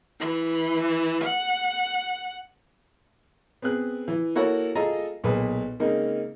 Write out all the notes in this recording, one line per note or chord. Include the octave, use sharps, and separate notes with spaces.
E3
F#5
B3 C4 G#4 F#6
E3
A#3 E4 F#4 A4 C#5 F#5
F4 G#4 A4 D#5 A#5
B1 A#2 G#4 B4
C#3 G#3 A#3 C4 D#4